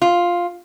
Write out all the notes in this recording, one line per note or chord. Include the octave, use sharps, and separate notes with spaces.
F4